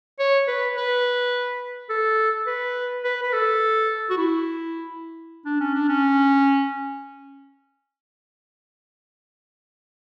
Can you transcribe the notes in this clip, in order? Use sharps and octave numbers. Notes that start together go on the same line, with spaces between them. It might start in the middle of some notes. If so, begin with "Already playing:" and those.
C#5
B4
B4
A4
B4
B4
B4
A4
F#4
E4
D4
C#4
D4
C#4